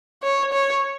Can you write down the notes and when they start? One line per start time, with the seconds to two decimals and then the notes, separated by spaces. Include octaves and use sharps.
0.23 C#5
0.52 C#5